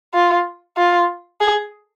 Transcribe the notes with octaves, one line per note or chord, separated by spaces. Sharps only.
F4
F4
G#4